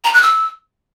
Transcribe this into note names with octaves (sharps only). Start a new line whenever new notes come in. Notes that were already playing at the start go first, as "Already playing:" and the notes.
A#5
F#6
E6